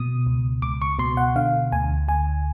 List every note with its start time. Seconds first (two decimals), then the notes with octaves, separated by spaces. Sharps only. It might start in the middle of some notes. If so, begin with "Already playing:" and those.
Already playing: B2 D#6
0.26 C#2
0.62 C#2 D6
0.82 C#6
0.99 B2 C6
1.17 F#5
1.36 D3 F5
1.72 D2 G#5
2.08 D2 G#5